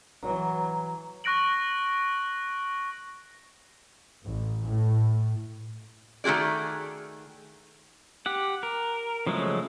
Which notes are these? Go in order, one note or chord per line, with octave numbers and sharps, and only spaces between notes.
E3 F#3 A#5
C#6 F#6 A#6 D7 F#7
A1
A2
D#3 A3 F#4 G#4 D5
G4 F#5
A#4
C#3 F3 F#3 G#3 A3